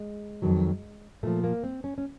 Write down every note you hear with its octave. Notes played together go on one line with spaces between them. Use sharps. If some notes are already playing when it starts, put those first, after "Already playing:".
Already playing: G#3
F2 C3 D#3 F#3
A#2 F3 A3
A#3
C4
C#4
C#4